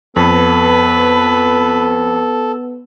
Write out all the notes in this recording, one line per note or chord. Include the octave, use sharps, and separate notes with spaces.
F2 B3 A4 B4